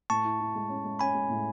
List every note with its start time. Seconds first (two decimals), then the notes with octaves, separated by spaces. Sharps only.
0.10 A2 A5 C#6
0.25 E4
0.40 E4
0.55 G#3
0.69 C#4
0.84 G#3
0.99 C#4 G#5 B5
1.15 G#3
1.30 A2